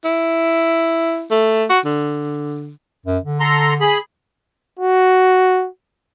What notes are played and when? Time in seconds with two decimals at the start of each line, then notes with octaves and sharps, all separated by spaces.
0.05 E4
1.31 A3
1.70 F#4
1.85 D3
3.06 F#2
3.24 D3
3.40 A4 A#5 C6
3.81 G#4 B5
4.79 F#4